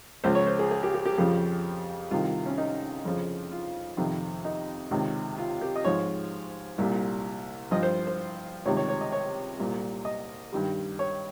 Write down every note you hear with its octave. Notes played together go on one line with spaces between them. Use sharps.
C#2 C#3 F3 C5
C#5
C5
G#4
G#4
G4
G4
G4
F2 C#3 F3 G4
C2 C3 D#3 F4
C#4
D#4
F2 C#3 F3
F4
F2 C3 D#3
D#4
C#2 C3 D#3
F4
G4
D#5
G#2 F3 C#5
C2 A#2 G3
G2 F3 D#5
C5
C5
C#2 C3 D#3 G3 C#5
C#5
C#5
D#5
C#5
C2 A#2 G3
D#5
G2 D#3 G3
C#5